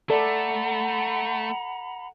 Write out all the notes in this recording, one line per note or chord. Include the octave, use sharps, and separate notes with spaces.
A3 A4 D5 F#5 A#5 B5